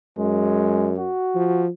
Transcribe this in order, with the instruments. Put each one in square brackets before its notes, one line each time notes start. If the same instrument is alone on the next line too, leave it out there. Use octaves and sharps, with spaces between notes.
[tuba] F#2 [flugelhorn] G#3
[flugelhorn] F#4
[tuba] F3